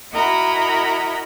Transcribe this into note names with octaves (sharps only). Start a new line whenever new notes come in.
E4 F#4 A#4 D#5 A#5 B5